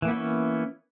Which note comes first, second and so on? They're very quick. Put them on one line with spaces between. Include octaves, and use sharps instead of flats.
E3 A#3 B3 E4 C#4